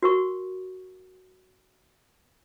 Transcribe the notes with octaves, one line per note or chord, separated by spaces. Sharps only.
F#4 A#4 C#6